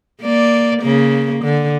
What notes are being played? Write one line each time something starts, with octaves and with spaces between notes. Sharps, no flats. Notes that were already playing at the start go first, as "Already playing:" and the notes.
A#3 D5
C#3 A#3
D3